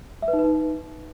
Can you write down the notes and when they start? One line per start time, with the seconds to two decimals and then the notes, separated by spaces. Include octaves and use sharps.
0.22 E5
0.28 B4
0.33 D#4
0.39 B4
0.44 D#4